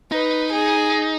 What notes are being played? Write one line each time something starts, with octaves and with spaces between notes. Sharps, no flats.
D#4 B4
G#4